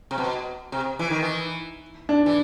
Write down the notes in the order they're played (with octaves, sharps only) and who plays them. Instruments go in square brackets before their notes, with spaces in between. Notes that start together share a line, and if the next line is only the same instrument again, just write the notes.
[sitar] C3
B2
C3
E3
D#3
E3
[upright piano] D4
[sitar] E3